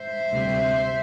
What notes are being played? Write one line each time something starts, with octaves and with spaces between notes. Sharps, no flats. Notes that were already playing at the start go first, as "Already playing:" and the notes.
Already playing: C5 E5
D2 C3 G3 C4